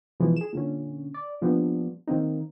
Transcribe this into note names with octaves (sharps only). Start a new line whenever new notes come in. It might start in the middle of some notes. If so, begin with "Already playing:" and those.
B2 E3 F3 G#3
G#4 E7
A#2 D3 C#4
D5
A#2 F3 G3 B3 D4
D#3 A#3 C4 D#4